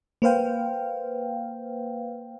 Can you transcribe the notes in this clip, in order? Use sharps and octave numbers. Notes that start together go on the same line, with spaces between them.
A#3 B4 C5 F5 G5